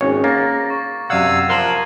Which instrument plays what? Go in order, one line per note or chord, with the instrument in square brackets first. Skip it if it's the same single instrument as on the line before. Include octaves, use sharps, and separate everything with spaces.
[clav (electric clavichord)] G#1 [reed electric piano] C#4 G#4 C#5
[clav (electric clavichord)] A#3 [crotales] A6 A#6
[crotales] C#6
[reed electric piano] F#2 D5 F#5 [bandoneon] C3 F5 E6 [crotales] G#6 D#7
[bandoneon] F3 A#4 [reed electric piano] F5 C6 [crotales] F#6 E7 F#7